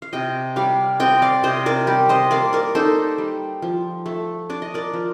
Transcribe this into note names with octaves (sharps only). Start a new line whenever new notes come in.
F5
C3 D#5 G5
G3 D5 F5
C4 D#5 G5
D5 F5
C3 C5 D#5
A#4 D5
G3 G4
C5 D#5
A#3 D5 F5
A#4 D5
D#4 A4 C5
G3
F3
A3
D4 D5
D#5
A#4 D5
F3